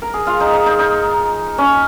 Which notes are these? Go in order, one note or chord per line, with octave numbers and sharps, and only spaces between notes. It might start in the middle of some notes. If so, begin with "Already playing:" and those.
A#4
G#4
F4
D#4
D#4
D#4
D#4
C#4